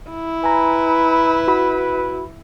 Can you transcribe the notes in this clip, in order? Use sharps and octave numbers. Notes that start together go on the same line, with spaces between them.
E4
B4 G#5 A#5
F#4 B5